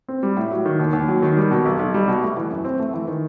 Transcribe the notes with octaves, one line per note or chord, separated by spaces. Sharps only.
C4
G3
A2
F#3
D#3
D#2
D#2
F#3
D#3
G3
B2
B1
B1
G3
B2
A3
E3
F#2
C4
A3
E3
D#3